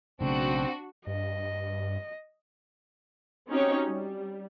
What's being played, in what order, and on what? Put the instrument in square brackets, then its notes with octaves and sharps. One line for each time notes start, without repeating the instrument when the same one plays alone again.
[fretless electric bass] B1 C#3 A3 [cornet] C4 [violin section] D4 F#4
[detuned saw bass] G2 [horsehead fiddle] D#5
[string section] C4 C#4 D#4 F#4 G4 C#5
G3